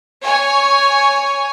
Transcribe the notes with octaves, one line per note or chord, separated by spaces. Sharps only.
C#5 G#5